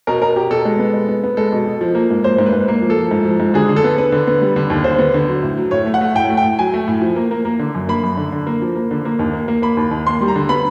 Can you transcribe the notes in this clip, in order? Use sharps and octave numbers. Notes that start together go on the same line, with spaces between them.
B2 A#4
B2 A#4
B2 G4
B2 A4
G#3
B3
G#3
B3
B3
G#3 A4
B2
B2
F3
A#3
G#2
A#3 C5
G#2
B4
G#2
A#3
F3
A4
F3
G#2
F3
G#2
D3 G#4
D3
A4
B3
B3 B4
D3
B3
G3
D3
D#2
D3 C5
B3
D3
F#3
A2
F#3
A2 C#5
A3
F#5
A3
A2 G5
A3
G5
A2
F#3 G#5
A3
A2
F3
A#3
A#3
A#3
D3
F#2
A#3 B5
F#2
D3
D3
A#3
F3
A#3
D3
A#3
D#2
A#3
A#3
A#3 B5
D#2
D#2
A#3 C6
G3
A#5
D3
B3 B5